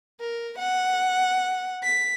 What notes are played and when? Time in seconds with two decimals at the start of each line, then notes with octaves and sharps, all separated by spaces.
0.20 A#4
0.59 F#5
1.83 B6